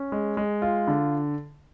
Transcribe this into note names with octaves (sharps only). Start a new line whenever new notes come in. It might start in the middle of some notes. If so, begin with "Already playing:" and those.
Already playing: C#4
G#3
G#3
F4
D3